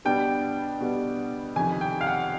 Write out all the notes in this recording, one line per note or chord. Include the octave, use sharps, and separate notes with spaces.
B2 G3 B3 D4 G5
B2 G3 B3 D4
F2 C3 D#3 G#5
G5
F5
F#5